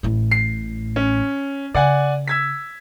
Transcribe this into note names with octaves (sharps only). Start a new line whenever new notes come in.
A1 A2
C7
C#4
C#3 D5 F#5 G#5
E6 G#6 B6